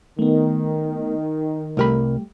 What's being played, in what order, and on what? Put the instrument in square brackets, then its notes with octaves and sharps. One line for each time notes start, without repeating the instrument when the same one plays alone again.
[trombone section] D#3 [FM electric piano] A3 B3
[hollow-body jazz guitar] C2 A#4 B5 [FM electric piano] G3 A3 G4